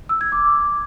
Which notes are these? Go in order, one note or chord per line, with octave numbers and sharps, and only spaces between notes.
E6
G#6
D6